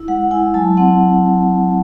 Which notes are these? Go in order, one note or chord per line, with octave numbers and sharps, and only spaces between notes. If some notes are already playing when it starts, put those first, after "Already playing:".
Already playing: E4
G#3 F#5
E4 G#5
F#3 A5
C4 F#5